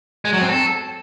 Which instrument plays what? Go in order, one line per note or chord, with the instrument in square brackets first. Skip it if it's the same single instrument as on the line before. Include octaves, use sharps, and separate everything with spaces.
[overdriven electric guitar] G#3
F#3
C4
A4